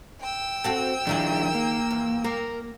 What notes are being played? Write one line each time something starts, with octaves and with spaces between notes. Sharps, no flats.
G5 E6
C4 F#4 A4
D#2 D#3 F3 D4 E4 G#4
A#3
E2
A#3 A#4